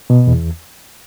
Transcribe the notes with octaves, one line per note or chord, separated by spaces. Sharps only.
B2
E2